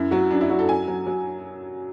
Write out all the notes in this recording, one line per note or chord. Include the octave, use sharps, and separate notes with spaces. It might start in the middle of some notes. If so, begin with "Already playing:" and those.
Already playing: F#2 E4
F#3 F#4
F#2 D4
E4
F#3 F#4
A4
F#2 G#5
F#3
F#3